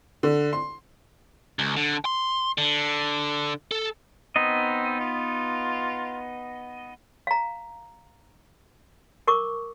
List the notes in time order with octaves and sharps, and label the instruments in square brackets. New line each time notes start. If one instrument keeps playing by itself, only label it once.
[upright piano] D3
C6
[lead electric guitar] C#2
D3
C6
D3
A4
[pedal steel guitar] B3 D#4 D#5 [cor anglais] C4
[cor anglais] F4
[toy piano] F5 A#5
A#4 C#6 D6